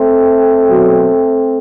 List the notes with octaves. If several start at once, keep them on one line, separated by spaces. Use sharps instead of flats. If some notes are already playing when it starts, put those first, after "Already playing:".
Already playing: A3 C4
B2 F#3